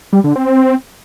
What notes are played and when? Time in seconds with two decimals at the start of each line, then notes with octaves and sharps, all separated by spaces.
0.13 G3
0.24 D3
0.36 C4